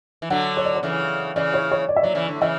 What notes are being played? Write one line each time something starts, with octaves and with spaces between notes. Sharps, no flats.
E3
D3 F#3 F#5
C#5
D5
C#5
C#3 E3
C#3 E3 D5
C#5
C#5
D5
E5
F#3 D5
C#3 E3
D3
C#3 E3 E5